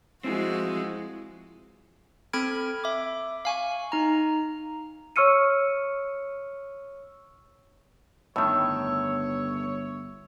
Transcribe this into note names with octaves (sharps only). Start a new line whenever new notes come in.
F3 G#3 C4 E4 F#4 G#4
C4 A4 B5 F6 G#6 D7
E5 D6
F5 G#5 C#6
D#4 A#5
C#5 C#6 E6 F6 C#7 D#7
G1 A2 D#3 C#5 E5